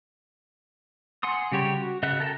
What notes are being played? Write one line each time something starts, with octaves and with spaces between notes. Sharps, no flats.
F#5 G#5 C6 D#6
C#3 G3 G4 C#5 G5
F#4
C#3 D#5 E5 F#5 F#6
A4 A#4 G5 A5